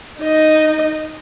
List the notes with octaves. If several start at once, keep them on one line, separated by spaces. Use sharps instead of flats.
D#4 D#5